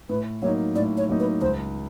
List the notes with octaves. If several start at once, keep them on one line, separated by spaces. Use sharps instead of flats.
A2 B4
F#3 A#3 D#4 C#5
A2 D5
C#5
F#3 A#3 D#4
B4
C#2 C5